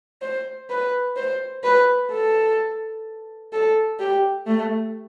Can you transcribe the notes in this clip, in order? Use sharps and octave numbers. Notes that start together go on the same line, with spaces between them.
C5
B4
C5
B4
A4
A4
G4
A3